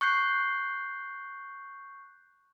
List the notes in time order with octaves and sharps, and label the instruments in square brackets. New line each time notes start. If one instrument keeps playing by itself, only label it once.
[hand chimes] C#6 F#6 G6 C7